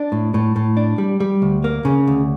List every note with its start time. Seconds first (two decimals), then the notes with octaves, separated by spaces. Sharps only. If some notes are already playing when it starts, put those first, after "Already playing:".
Already playing: D4
0.12 A2
0.34 A2
0.56 A2
0.77 D4
0.98 G3
1.20 G3
1.42 D2
1.64 A#3
1.85 C#3
2.07 D2